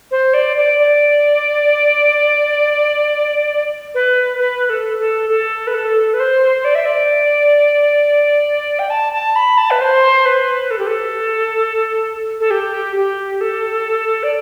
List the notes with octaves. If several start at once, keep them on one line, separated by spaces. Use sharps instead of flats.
C5
D5
D5
D5
B4
B4
A4
A4
A4
B4
A4
B4
C5
D5
E5
D5
G5
A5
A5
B5
A5
B4
C5
B4
A4
G4
A4
A4
G4
G4
A4
D5